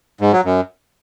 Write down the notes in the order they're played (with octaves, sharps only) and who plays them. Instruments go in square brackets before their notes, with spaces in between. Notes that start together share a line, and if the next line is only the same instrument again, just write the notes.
[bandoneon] G#2
F#3
F#2